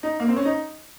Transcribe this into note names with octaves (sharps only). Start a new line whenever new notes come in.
D#4
A#3
C4
C#4
D#4